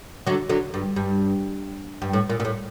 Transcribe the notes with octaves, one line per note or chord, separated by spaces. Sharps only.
D3 F#3
D3 F#3
G2
G2
G2
A2
A#2
A#2
A2